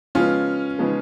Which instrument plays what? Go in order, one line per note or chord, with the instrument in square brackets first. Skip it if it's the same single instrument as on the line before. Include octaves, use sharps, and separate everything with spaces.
[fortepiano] C#3 F3 G#3 B3 [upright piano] C#4 F4
[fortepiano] C#3 F3 G#3 B3